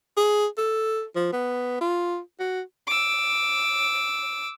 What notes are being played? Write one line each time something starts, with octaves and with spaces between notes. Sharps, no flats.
G#4
A4
F3
B3
F4
F#4
D6 E6